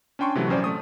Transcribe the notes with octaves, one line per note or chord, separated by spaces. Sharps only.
C#4 D4 G5 C6 C#6
C3 E3 F#3 A3
A#1 F#2 C#4 C5 D5
A3 C#6 D#6